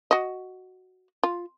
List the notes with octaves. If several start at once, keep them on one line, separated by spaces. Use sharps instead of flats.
F#4 D#5
F4